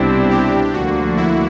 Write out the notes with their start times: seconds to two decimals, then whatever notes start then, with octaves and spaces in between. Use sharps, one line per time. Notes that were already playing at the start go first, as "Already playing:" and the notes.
Already playing: C2 B2 G3 C4 D4 E4
0.30 G4
0.73 D2 D3 F3 A#3 F#4
1.17 E4